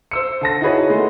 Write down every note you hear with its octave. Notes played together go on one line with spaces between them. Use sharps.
C5 E6 C#7
D3 A5 A#6
D#4 E4 F#4 G#4 B4 C#5
G#3 A3